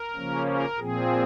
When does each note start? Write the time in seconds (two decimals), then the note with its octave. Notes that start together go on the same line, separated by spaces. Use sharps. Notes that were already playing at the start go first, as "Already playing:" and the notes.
Already playing: A#4
0.15 C#3 F3 A#3 C#4
0.46 A#4
0.78 A#2 F3 C4 G#4